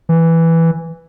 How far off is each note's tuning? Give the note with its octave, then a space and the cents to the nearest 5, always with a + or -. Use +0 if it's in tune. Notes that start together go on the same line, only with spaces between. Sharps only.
E3 +0